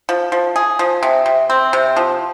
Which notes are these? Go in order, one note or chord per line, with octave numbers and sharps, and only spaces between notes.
F3
F3
G#4
F3
C3
C3
C4
C3
F3